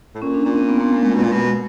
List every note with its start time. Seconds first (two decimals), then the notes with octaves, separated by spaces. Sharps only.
0.15 A2
0.22 A#2 C#4
0.34 D4
0.45 A#2 C#4
0.56 C4
0.69 B3
0.80 A#3
0.92 A3
1.03 G#3
1.15 B2
1.24 A#2
1.32 B2